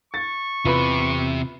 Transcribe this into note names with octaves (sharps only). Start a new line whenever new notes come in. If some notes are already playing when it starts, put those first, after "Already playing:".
C#6 A6
E2 C3 E3 F4 B4 B5